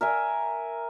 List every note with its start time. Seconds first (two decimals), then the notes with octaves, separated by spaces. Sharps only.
0.01 A#4 E5 G#5